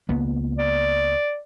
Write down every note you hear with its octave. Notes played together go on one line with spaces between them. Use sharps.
C#2 A#3 B3
D5